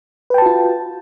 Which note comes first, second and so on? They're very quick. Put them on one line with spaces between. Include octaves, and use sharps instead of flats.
B4 G5 A5 F#4 F4